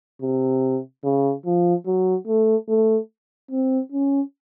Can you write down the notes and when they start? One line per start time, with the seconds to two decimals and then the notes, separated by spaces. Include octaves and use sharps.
0.22 C3
1.04 C#3
1.46 F3
1.87 F#3
2.28 A3
2.69 A3
3.51 C4
3.92 C#4